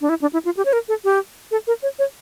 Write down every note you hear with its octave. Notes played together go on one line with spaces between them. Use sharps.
D4
E4
D4
E4
F4
G4
C#5
A#4
A4
G4
A4
A#4
C#5
C#5